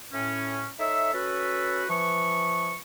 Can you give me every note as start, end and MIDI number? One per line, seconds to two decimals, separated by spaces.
0.13 0.67 45
0.13 0.67 61
0.80 1.12 63
0.80 1.12 69
0.80 1.12 73
0.80 1.12 76
1.13 1.84 61
1.13 1.84 66
1.13 1.84 69
1.13 1.84 71
1.89 2.75 52
1.89 2.75 53
1.89 2.75 71
1.89 2.75 85